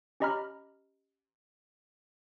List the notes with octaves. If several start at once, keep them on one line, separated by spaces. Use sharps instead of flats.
C#4 G4 D#5 A#5 B5 F6